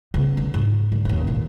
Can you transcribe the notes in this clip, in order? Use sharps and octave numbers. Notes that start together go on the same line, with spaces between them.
C#3 B3
D3
G#2
D3
A1 D#2
A#2 D#3